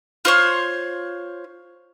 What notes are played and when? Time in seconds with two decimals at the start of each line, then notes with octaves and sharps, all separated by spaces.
0.25 F4 C5 C#5